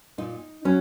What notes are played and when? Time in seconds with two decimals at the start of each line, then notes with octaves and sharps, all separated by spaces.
0.18 A#2 D#4
0.65 F#3 C#4